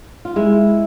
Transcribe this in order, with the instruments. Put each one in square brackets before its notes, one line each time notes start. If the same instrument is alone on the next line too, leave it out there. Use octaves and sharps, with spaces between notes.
[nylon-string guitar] F4
G#3 E4